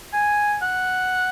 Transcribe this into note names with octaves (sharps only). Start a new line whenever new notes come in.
G#5
F#5